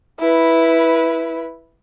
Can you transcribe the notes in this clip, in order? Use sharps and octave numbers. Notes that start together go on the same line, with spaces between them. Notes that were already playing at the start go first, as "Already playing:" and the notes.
E4 B4